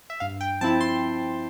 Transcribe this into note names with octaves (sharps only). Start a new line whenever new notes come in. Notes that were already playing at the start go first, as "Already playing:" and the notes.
E5
G2 F5
G5
F3 C4 E4 A5
C6